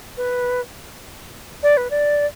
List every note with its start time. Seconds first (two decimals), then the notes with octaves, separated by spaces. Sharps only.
0.17 B4
1.63 D5
1.77 B4
1.90 D5